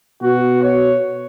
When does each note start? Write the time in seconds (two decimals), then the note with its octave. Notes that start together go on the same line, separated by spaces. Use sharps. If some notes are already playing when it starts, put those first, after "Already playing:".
0.22 B2 F#4
0.63 C#5